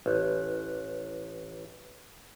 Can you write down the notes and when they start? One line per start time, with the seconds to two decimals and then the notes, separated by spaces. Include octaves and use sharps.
0.06 A1 B4 F#6